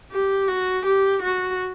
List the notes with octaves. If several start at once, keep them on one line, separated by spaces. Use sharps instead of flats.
G4
F#4
G4
F#4